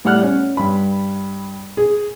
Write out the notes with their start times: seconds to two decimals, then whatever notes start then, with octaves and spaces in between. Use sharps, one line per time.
0.05 A2 G3 F#5 F6 F#6
0.23 C#4
0.57 G2 B5
1.77 G#4